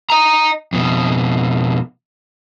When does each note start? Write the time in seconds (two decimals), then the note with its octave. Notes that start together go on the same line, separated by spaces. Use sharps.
0.10 D#5 A#5
0.73 F2 B2